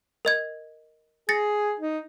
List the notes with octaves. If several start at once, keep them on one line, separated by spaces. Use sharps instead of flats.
A#4 D#5 G#6
G#4 A6 A#6 C#7
D#4